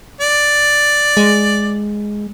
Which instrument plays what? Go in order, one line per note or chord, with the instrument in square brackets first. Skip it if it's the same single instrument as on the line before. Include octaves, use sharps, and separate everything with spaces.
[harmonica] D5
[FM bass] G#3